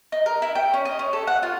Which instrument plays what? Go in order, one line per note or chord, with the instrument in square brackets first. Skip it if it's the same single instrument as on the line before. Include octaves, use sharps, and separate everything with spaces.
[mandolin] D#4
A#4
E4
G5
C#4
D#5
C#4
A4
F#5
F4